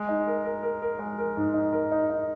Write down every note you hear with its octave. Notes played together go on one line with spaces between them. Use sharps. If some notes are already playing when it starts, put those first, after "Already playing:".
Already playing: G#3
D#4
A#4
A#4
A#4
A#4
G#3
A#4
G#2
D#4
A#4
D#4
D#4